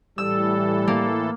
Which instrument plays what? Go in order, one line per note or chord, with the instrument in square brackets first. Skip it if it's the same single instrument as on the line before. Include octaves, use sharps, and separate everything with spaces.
[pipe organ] A2 E3 A4 [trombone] G3 [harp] E6
[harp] A#3